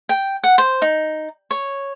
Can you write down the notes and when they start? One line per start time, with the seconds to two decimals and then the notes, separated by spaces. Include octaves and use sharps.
0.09 G5
0.44 F#5
0.58 C5
0.82 D#4
1.51 C#5